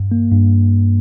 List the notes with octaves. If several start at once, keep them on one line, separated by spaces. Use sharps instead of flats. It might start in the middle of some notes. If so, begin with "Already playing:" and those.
Already playing: G2
A#3
G2